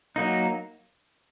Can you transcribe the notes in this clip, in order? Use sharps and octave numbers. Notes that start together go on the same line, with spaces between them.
F#3 A#3 D#4